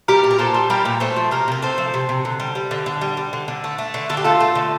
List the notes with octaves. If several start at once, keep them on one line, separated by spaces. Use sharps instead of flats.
G3 G4 A#4
A#2
A#4
A#2 A4 C5
G3
G3 G4 A#4
A#2
A3 A4 C5
F3
C3 G4 A#4
C3 A#4
A3 A4 C5
F3
C3
C3
D3
G3
G3
D3
D3
G3
G3
D3
D3
A3
A3
D3
D3 A4
G4
A3 F4 A4
A3
D3